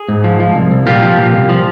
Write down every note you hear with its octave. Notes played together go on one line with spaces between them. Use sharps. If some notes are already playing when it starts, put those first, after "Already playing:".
Already playing: G#4
G#2
F3
F3
C2
C2
A#2 F4 G4
F3
A#2
C2
F3